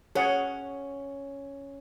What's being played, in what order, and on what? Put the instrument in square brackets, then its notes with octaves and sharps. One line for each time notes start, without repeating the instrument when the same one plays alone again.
[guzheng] C#4 [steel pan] G#4 C#5 F#5